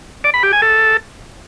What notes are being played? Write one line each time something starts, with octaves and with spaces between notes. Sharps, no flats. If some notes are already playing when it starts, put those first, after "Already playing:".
D5
B5
G4
G#5
A4